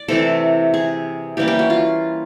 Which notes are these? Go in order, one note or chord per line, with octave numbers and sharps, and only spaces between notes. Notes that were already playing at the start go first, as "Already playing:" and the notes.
Already playing: D5
C3 E3 A3 A4
G#4
E3 G3 A#3 C#4 G4
G4
F#4
F4